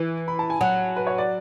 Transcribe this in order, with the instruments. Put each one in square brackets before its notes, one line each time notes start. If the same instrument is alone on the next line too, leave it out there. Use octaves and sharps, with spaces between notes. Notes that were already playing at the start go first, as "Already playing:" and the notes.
Already playing: [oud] E3
[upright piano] B5
A5
G#5
[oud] F#3 [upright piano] F#5
[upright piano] B4
C#5
D5